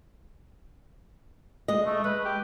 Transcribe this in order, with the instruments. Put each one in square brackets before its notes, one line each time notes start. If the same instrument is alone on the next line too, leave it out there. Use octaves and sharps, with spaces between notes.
[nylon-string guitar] G#3 D#5
[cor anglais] A3
[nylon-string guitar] G#3 [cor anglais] B4
[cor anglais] G4